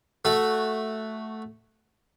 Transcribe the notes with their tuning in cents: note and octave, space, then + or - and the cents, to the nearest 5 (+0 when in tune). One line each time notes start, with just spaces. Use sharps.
A3 +0 F#4 +0